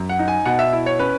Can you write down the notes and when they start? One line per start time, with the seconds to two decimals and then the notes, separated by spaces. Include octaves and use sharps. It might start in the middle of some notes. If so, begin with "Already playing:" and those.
Already playing: F#2
0.09 F#5
0.19 D#4
0.28 G#5
0.45 B2 F#5
0.59 E5
0.73 E4
0.86 C#5
0.99 C#4 B4